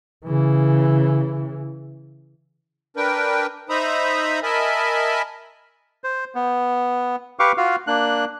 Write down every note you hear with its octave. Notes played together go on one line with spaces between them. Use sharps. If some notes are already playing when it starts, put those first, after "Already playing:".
C#3 E3
D4 A#4 B4 G5
D#4 C5 E5 A#5 B5 D#6
A#4 D#5 E5 G#5 A5 B5
C5
B3
G4 B4 F5 C#6 D6
F4 F#4 F5
A#3 D4 F#6